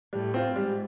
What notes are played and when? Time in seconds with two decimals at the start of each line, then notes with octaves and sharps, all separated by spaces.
0.12 A2 G3
0.34 C4 F4
0.55 G#2 G3